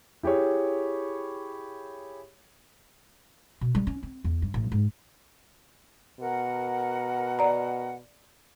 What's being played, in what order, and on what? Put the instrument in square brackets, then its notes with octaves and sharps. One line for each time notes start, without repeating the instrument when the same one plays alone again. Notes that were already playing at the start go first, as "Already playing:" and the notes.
[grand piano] E4 G4 G#4 C#5
[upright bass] B2
G3
C#4
C4
E2
G2
A1
G#2
[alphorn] B2 [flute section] A#4 F#5
[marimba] D5 A#5